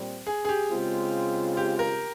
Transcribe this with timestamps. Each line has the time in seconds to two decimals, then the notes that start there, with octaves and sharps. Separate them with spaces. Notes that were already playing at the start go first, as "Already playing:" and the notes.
Already playing: A#2 G3 C4
0.27 G#4
0.45 G#4
0.49 G4
0.71 C#3 G#3 C4 F4
1.57 G4
1.79 A#4